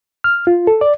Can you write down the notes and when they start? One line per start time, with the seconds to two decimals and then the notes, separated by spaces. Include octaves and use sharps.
0.24 F6
0.47 F4
0.67 A4
0.81 D5